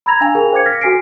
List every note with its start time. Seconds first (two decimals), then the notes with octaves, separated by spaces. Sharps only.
0.06 A#5 B5 E6 G#6 A#6 F7
0.21 D4 F5 G5 G#5 F7
0.35 G#4 A#4 G5 G#5
0.53 C5 F5 D6 G#6 C#7
0.66 F6 A#6 B6
0.81 F#4 A4 G#5 B6 C7 D7